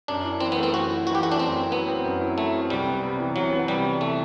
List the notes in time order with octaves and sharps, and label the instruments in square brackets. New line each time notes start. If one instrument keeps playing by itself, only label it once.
[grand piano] F#2 [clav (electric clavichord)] D4
[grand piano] E4
[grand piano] E3 [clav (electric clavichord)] C4
[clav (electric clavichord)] B3
[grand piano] A3
[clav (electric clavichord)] C4
[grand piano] F#2 [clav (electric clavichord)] F#4
[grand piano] E4
[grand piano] E3 [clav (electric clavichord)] F#4
[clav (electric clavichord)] G4
[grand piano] A3 [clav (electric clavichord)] F#4
[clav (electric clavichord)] D4
[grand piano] F#2 [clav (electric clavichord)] C4
[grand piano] E4
[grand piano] F#3 [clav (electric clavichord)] B3
[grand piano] C4
F#2
E4
[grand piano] F#3 [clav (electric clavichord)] A3
[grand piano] C4
[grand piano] C2 [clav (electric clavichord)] G3
[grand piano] B3
C3
E3
[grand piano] C2 [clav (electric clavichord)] F#3
[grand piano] B3
[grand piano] C3 [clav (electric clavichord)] G3
[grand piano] E3
[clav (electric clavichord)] A3